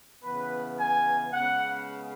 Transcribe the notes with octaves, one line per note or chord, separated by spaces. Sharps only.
C#3 E3 B3 B4
G#5
C#3 G#3 B3 F#5